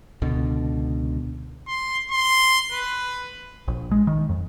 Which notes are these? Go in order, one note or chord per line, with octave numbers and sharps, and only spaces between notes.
C#2 B2 D3
C6
C6
B4
A#1
G#3
D#3
F2